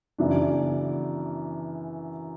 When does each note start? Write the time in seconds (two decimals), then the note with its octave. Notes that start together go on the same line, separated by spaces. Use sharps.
0.18 F#2 C#3 E3 B3 D4